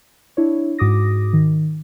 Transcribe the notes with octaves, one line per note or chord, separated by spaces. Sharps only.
D4 E4 C#5
G#2 F#4 D6 D#6 A#6
D#3